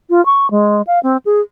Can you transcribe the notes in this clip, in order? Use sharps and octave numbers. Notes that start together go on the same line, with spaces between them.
F4
C#6
G#3
F5
C4
G#4